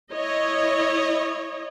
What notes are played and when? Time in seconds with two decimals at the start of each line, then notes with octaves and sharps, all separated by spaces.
0.12 E4 C#5 D#5